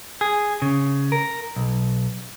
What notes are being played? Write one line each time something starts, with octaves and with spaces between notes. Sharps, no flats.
G#4
C#3
A#4
B1